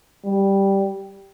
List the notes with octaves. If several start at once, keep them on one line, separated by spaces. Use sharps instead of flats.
G3